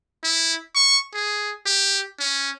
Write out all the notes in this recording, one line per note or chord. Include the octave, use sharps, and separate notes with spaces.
E4
C#6
G#4
G4
C#4